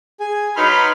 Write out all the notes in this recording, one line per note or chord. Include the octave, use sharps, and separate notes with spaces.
G#4 G#5
F#3 D#4 B4 B5 C6 F6